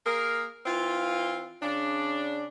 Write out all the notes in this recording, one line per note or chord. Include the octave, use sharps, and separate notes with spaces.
A#3 G#4 A#4
E3 C4 F4
C#3 D4